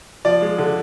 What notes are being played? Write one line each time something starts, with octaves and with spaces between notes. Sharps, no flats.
F3 D5
G#3
D3